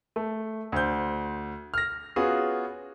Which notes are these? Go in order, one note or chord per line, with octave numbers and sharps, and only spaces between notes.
A3
D2 C5 G6
F6 A#6
B3 C#4 F4 F#4 G#4